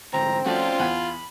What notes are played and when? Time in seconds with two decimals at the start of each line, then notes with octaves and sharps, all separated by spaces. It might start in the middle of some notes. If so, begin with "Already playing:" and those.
0.13 D2 G#2 C4 A#5
0.46 F3 A3 C#4 F4 F#4 D5
0.79 E2 F#5 G#5 B5